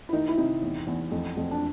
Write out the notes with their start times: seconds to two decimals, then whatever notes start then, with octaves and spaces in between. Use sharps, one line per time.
0.09 E4
0.13 D#3 D#4
0.28 E4
0.38 C3 D#4
0.62 E2
0.87 E2
1.12 F2
1.37 F2
1.51 D4